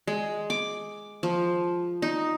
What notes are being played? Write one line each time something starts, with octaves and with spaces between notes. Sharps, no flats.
G#3
D6
F3
D#4